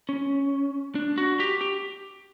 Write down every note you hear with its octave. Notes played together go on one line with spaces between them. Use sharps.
C#4
D4
F#4
G4
G4